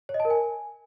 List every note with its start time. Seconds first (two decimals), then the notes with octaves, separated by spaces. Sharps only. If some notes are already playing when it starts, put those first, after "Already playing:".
0.09 C#5
0.14 D#5
0.20 A5
0.25 A#4
0.30 G#5